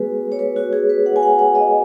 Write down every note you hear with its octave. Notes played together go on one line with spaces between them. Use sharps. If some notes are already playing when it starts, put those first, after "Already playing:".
Already playing: G#3 B3 F#4 G#4 B4
C#5
B4
F#4
G#4
B4
F#5
G#5
F#5
F#5
D#5